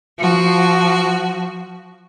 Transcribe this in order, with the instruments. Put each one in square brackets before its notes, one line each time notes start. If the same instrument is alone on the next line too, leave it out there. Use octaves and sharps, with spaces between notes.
[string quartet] F3 F#4